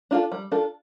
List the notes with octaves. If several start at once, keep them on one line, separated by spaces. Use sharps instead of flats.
D4 F4 A4
G3
D4 F4 A4